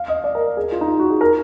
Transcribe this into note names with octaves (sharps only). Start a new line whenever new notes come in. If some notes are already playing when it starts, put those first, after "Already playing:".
Already playing: F5
D#5
D5
A#4
G#4
F4
D#4
F4
F#4
G#4
A#4